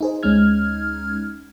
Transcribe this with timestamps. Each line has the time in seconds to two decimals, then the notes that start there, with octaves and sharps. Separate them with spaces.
0.01 D#4 G#4 C5
0.23 D2 G#3 C#4 D#4 F6 G#6